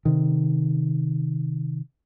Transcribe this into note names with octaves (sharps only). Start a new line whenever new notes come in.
C3 D#3